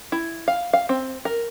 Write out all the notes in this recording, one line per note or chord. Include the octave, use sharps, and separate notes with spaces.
E4
F5
F5
C4
A#4